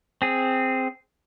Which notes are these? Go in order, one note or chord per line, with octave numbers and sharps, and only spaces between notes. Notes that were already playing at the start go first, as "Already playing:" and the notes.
C4 G#4